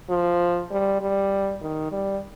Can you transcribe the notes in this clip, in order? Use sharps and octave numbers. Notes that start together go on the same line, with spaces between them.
F3
G3
G3
D#3
G3